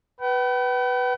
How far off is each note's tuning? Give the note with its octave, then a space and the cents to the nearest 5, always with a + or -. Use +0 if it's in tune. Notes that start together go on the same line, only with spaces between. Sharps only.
B4 +0 G5 -45